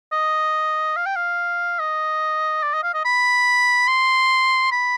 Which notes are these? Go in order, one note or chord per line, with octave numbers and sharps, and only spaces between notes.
D#5
F5
G5
F5
D#5
D5
D#5
F5
D#5
B5
C6
B5